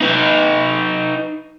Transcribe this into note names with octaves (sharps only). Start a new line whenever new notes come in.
D#4 B4